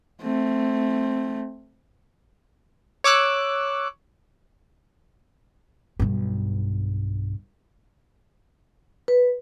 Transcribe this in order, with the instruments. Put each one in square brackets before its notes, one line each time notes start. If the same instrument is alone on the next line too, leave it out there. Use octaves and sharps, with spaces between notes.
[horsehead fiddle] A3 C4
[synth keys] C#5 D6 E6 F#6
[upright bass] B1 G2
[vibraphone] B4